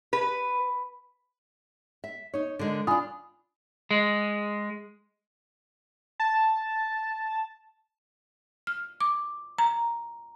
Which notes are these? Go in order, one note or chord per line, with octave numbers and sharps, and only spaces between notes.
B4
E5
D#4 C#5
D3 G#3 A#4
D4 F4 G#5 B5 D#6
G#3
A5
F6
D6
A#5